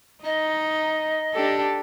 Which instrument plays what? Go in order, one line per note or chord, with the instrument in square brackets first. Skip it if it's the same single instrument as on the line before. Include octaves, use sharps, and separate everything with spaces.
[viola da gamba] D#4 [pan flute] D#5
[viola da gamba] D4 G4 A4